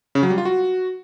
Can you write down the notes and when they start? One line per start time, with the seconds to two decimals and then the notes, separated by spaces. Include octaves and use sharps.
0.15 C#3
0.23 F#3
0.30 G3
0.38 F4
0.45 F#4